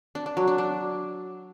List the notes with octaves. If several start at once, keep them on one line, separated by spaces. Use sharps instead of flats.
D4
D4
F#3
D4
D4